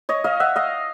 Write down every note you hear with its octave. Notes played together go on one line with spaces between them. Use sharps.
C#5 D#5
D#5 F5
E5 F#5
D#5 F5